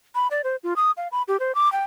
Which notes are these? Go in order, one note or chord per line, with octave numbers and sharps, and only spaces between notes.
B5
D5
C5
F4
D#6
F5
B5
G4
C5
D6
G5